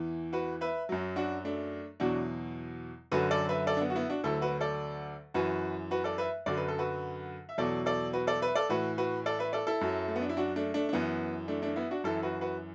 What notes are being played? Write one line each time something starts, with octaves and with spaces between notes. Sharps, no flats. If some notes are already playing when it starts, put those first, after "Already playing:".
Already playing: E2 E3
F#4 B4
B4 E5
F#2 F#3
D4 F#4
A3 D4
E2 B2 F#3 D4 F#4
F#2 D3 F#3 F#4 B4
A4 D5
B4 E5
A4 D5
D4
B3
F#4
B3 E4
D4 F#4
D2 D3 F#3 E4 A4
F#4 B4
A4 D5
F#2 E3 F#4 B4
F#4 B4
A4 D5
B4 E5
F#2 D3 F#3 D5
B4
A4
F#4 B4
E5
E2 B2 F#3 A4 D5
A4 D5
F#4 B4
A4 D5
B4 E5
A4 D5
A2 E3 F#4 B4
F#4 B4
A4 D5
B4 E5
A4 D5
E4 A4
F#2 F#3
A3
B3
D4
E4
D4 F#4
A3 D4
A3 D4
D4
F#2 E3 B3
A3 D4
A3 D4
B3 E4
D4 F#4
F#2 E3 E4 A4
F#4 B4
F#4 B4